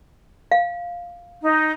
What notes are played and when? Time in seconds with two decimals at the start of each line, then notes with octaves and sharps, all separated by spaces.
0.52 F5
1.42 D#4